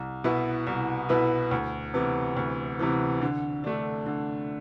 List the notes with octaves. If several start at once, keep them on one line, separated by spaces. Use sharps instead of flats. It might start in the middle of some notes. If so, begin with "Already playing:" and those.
Already playing: C2
B2 B3 E4 B4
C2
B2 B3 E4 B4
D2
C3 E3 B3
D2
C3 E3 B3
D3
A3 D4
D3